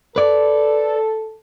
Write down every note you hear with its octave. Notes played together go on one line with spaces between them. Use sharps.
A4 B4 D5